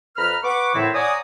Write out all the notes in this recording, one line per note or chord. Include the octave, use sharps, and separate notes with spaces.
F2 B4 A#5 B5 F6
B4 F#5 C#6 D6
A2 D#3 C4 E4
C#5 D5 F#5 G#5 A#5 D#6